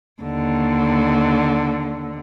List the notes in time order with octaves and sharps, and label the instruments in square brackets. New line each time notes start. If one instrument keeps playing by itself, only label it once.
[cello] D#2 D3